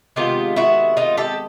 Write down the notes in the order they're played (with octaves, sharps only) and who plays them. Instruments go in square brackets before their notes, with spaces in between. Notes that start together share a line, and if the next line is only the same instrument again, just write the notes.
[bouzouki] C3 D#3 G#3 B3 F4 G4
E4 F#4
D#4 F4
G4 A4